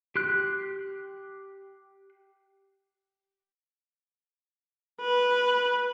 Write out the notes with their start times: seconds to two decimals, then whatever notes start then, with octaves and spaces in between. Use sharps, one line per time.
0.16 G4 C6 F#6
5.01 B4